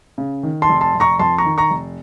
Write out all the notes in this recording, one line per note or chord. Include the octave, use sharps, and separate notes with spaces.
C#3
D#3
A5 C6
F1
A5 C6
F1
A#5 C#6
F2 A5 C6
A#5 C#6
D#3
A#5 C#6
F1